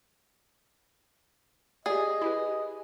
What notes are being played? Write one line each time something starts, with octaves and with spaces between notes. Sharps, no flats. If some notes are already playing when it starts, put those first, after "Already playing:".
G4 G#4 D5 D#5
E4 G4 B4